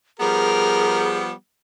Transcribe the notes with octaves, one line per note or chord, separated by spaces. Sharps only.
F3 G3 B3 G#4 A#4